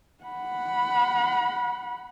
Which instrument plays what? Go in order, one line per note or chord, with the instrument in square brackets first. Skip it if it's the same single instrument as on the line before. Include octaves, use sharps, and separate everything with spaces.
[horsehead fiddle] F#5 B5